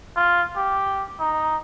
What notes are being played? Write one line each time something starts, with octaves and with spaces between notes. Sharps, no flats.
F4
G4
D#4